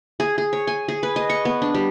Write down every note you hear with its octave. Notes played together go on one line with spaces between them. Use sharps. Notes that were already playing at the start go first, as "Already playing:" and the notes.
G#4
G#4
C#5
G#5
G#4
B4
D#5
C#6
B3
D4
G3